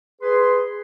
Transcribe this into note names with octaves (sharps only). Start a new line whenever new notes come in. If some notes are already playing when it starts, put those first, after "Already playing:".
G#4 B4 C6